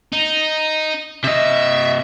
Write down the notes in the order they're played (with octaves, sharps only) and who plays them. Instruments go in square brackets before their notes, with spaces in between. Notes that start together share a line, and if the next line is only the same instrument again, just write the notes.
[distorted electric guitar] D#4
[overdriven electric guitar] C3 D#5 [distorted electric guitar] E5